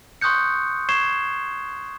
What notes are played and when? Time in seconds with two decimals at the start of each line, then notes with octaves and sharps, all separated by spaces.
0.21 C6 C#6 D#6 F#6 G6 C#7
0.89 C#6 G#6 C7 E7 G7